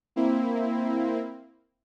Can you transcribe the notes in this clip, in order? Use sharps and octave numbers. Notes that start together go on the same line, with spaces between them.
A#3 C4 E4